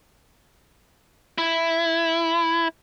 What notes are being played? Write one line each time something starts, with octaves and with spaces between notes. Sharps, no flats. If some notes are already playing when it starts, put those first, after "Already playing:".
E4